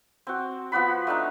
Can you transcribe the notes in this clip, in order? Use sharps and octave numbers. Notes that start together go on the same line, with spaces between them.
C4 F#4
F3 B3 F#4 B5
A3 D4 D#4